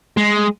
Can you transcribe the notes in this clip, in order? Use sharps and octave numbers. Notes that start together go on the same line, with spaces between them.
G#3